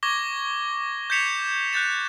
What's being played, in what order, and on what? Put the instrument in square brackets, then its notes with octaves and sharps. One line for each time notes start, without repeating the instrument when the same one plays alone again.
[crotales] C#6 D6 G#6 A#6 G7
G6 G#6 B6 C#7 E7 F7
F#6 G6 A6 E7